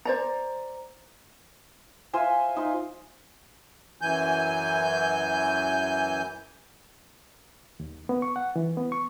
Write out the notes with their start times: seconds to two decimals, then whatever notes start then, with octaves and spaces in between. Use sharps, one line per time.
0.05 C5 D5 A#5
2.13 F4 C5 E5 G#5
2.56 D#4 F4
4.01 F#2 E3 G#5 G6
7.80 D#2
8.09 B3
8.22 C#6
8.36 F#5
8.56 E3
8.77 B3
8.92 C#6